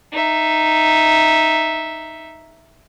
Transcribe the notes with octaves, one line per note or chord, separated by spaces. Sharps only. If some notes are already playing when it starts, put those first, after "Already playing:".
D#4 E5